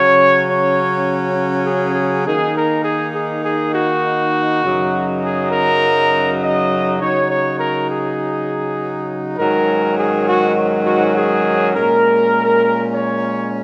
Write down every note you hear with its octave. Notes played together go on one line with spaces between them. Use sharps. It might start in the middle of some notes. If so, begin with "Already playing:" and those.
Already playing: C#3 F#3 C#4 C#5
C#5
G#4
G#4
D#3 A#3 D#4 G#4
A#4
G#4
G#4
G#4
F#4
F#2 C#3 F#3 D#4
G#4
A#4
D#5
C#3 F#3 D#4 C#5
C#5
A#4
G#4
G#2 D#3 F#3 C#4 A#4
G#4
F#4
F#4
G#4
A#2 G#3 C#4 A#4
C#5